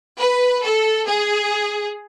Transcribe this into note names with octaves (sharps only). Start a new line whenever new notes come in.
B4
A4
G#4